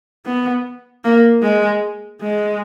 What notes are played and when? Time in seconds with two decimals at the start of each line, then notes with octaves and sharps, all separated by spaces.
0.26 B3
1.04 A#3
1.43 G#3
2.22 G#3